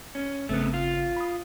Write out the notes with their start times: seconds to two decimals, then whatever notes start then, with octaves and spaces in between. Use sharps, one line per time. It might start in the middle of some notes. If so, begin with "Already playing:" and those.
0.15 C#4
0.49 G#1 C#3 A3 B3 C4
0.74 F4
1.16 B5 D#6